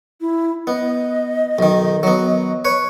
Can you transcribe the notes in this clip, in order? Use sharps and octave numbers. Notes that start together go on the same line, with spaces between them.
E4
B3 D#5
B1 D#3
F#3 B3
B4 C#5